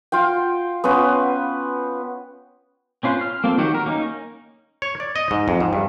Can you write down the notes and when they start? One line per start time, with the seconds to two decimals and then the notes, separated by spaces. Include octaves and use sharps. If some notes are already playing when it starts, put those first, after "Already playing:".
0.12 F4 F5 G5
0.84 B3 C#4 F4 B4
3.03 C4 C#4 F4 B4 C5
3.21 F6
3.44 A#3 C4 F4 A4
3.58 D#3 F#3 F#4 G4
3.75 A#4
3.86 A#3 C#4 D#4
4.82 C#5
5.00 D5
5.16 D#5
5.31 G#2
5.48 F2
5.60 G#2
5.73 G2